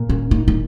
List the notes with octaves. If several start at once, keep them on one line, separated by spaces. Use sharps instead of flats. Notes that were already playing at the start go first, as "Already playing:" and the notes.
Already playing: A#2
C#4
D#4
D#4